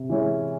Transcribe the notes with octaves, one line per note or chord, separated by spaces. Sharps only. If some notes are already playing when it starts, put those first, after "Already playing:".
Already playing: C3
E3 G#3 C#4 E4